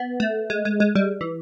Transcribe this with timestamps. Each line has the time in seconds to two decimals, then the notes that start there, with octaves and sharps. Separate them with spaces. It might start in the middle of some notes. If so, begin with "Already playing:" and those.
Already playing: B3
0.20 A3
0.50 G#3
0.65 G#3
0.80 G#3
0.95 G3
1.21 E3